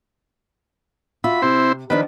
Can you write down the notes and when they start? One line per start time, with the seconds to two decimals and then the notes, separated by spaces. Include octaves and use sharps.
1.24 F4 F#4 E5 B5
1.42 C3 C4 E4 C5
1.90 D#3 F3 D4 B4